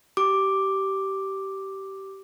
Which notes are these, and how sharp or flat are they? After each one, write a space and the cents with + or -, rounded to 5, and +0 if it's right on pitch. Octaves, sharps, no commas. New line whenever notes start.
G4 -20 D6 +0